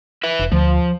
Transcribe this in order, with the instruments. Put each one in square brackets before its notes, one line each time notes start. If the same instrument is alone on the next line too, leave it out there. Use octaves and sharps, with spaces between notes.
[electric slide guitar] B4 E5
[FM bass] F1
[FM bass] D2 [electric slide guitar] F3